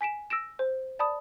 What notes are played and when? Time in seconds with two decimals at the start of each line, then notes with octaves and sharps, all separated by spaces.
0.01 G#5 B6 D7 E7
0.30 E6 A#6 D7 E7
0.59 C5
0.99 D5 A5 B5 D#6